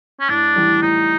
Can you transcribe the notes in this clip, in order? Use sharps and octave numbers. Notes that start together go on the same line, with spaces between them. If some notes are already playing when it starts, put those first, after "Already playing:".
C#4
A2 D4
E3 G3
A2 D#4